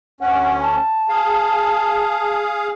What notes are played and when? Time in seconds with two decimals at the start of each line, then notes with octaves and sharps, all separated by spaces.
0.21 D2 C#4 F#5
0.62 A5
1.09 G#4 F5